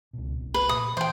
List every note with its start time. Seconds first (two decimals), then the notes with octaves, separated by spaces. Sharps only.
0.13 C#2 B2
0.40 F#1 C2
0.54 B4
0.69 A#2 D#6
0.97 E3 C5 G5